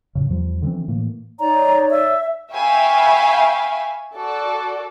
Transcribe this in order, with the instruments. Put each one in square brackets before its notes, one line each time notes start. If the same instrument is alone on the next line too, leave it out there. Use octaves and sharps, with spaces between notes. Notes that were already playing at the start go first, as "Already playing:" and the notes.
[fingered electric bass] F#2 A2 C#3
E2 F3 G3
D3 E3 F3 C4
A2 E3 A#3
[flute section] D#4 C#5 D5 [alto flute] A#5
[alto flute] E5
[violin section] E5 F5 G5 G#5 B5 C#6
F#4 A4 D5